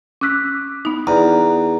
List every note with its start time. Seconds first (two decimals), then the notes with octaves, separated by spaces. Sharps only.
0.21 C#4 D6 E6 F#6 B6
0.85 B3 D#4
1.07 E2 D5 A#5